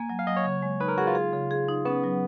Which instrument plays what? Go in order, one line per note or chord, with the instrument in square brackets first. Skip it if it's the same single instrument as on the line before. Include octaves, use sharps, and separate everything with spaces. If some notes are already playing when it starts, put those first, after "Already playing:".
Already playing: [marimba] A#3 [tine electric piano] G#5
[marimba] F#3
[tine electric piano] F5
[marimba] F#3 [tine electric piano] D#5
[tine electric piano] C#5
[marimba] C#3
G#3
[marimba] D#4 [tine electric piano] B4
[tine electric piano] A#4
[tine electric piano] F#4 [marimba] G#4
[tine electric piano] F4
[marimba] G#4
C#3
G#4
D#4
[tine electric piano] B3 [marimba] C#4
[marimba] F#3